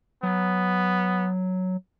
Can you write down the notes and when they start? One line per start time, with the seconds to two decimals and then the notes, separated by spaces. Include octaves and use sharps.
0.23 F#3 B3